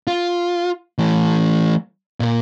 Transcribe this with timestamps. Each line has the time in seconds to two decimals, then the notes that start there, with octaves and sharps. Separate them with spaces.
0.07 F4
0.98 E3 A3
2.20 A#2 A#4